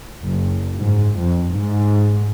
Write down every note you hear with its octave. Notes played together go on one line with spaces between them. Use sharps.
F#1
G#2
F2
G#2